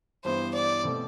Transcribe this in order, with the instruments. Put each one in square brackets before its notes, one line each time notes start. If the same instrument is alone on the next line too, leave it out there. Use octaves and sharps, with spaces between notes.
[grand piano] G2 E3 B3 [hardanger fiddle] C5
[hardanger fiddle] D5
[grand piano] B2 A3 C4